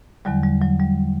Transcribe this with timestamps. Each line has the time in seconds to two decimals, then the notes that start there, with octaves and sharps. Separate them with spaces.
0.25 E2 D3 F#3 G3
0.43 G3
0.62 F#3
0.80 G3